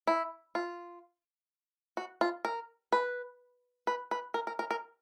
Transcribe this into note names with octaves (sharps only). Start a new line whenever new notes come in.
E4
F4
F#4
F4
A#4
B4
B4
B4
A#4
A#4
A#4
A#4